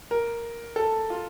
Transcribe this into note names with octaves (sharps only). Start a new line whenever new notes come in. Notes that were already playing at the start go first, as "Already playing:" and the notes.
A#4
A4
F4